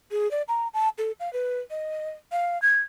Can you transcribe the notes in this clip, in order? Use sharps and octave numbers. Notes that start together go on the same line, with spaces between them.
G#4
D5
A#5
A5
A4
F5
B4
D#5
F5
G#6